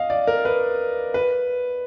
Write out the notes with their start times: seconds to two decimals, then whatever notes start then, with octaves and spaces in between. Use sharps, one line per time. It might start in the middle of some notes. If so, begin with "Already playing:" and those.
Already playing: D#5 F5
0.10 D5
0.27 A#4
0.45 B4
1.14 B4